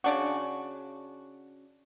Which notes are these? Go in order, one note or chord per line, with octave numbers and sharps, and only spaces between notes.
C#3 D4 F#4